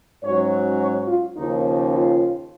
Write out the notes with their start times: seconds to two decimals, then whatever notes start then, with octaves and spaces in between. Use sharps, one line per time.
0.23 G#2 F#3 C#4 C#5
0.79 C#5
1.07 F4
1.35 D#2 C#3 F3 D#4
1.91 F4